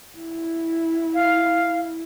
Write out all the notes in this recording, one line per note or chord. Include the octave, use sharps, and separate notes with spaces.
E4
F5